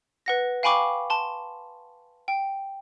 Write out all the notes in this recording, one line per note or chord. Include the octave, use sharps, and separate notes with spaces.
B4 F#5 A#6
F5 G5 G#5 B5 C#6 D6
A5 C6
G5